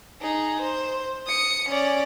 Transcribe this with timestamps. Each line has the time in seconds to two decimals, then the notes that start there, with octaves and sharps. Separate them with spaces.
0.21 D#4 G#4
0.61 C5
1.27 D#6 C#7
1.69 C#4 D5